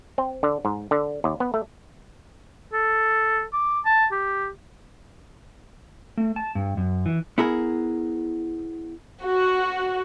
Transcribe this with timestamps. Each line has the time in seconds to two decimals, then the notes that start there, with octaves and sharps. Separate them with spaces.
0.18 C4
0.43 D3
0.65 G#2
0.91 D3
1.24 D#2
1.40 B3
1.54 A3
2.73 A4
3.53 D6
3.85 A5
4.12 G4
6.17 A3
6.36 A5
6.55 G2
6.77 F#2
7.06 E3
7.38 B3 E4 G#4 A#4
9.22 F#4